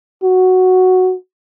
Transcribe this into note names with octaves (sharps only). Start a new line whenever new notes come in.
F#4